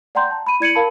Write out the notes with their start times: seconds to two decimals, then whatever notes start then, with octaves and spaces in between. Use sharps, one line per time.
0.15 D5 F#5 G5 A#5 C6 G6
0.31 A5
0.47 B5 D#7
0.60 E4 D5 G#6 C#7 D#7 F#7
0.75 A#4 F5 A5 B5